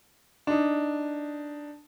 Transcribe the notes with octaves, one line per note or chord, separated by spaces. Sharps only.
D4 D#4